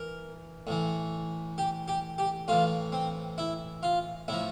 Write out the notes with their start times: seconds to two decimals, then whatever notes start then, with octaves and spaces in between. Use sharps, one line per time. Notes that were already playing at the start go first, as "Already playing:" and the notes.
Already playing: E3 A#4
0.67 A2 E3
1.58 G4
1.88 G4
2.18 G4
2.48 A2 E3 F4
2.92 C4
3.38 E4
3.83 F4
4.28 A2 F3 E4